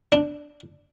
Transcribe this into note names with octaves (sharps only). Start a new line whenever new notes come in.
D4